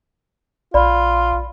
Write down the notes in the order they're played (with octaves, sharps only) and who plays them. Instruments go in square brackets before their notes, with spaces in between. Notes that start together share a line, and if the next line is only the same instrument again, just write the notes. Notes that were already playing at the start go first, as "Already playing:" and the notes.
[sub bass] A#1 [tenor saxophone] F4 [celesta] D5 B5